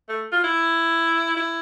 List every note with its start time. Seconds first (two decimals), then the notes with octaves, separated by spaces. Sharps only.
0.09 A3
0.32 F4
0.44 E4
1.36 E4